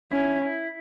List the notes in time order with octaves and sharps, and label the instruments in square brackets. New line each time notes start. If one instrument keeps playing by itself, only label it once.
[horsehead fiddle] C#4 [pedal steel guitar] E4
[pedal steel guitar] E4